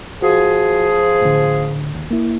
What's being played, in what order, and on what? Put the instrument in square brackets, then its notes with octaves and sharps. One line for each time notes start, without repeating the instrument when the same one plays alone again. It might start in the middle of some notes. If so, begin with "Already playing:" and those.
[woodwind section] F3 G#4 [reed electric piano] F#4
[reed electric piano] A2 D3
D#2
A#3 E4